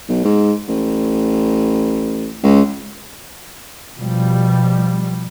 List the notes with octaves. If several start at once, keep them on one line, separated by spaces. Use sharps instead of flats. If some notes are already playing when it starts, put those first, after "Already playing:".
B1
G#2
A1
C#2
B2 F3 G3